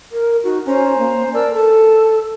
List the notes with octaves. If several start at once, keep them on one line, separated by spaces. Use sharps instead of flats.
A#4
D#4 F#4
C#4 C5 G#5 A#5
A#3
A#4 D5 A5 E6
A4 A5